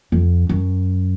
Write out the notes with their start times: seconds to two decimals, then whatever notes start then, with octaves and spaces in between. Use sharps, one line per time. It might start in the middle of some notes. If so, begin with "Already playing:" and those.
0.12 F2
0.49 F#2